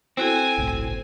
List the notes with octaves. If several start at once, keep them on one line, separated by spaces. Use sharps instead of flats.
C4 E4 F#4 A4 G#5
G1 C2 A2